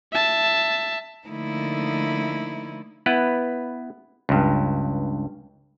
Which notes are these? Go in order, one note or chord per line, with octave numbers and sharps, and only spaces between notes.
E5 A5
D3 F3 A3 A#3 D#4 E4
B3 E4 B4
C#2 G2